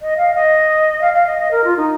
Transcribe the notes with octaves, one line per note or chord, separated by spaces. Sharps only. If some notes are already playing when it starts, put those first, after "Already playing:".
D#5
F5
D#5
F5
F5
D#5
D#5
A#4
F4
D#4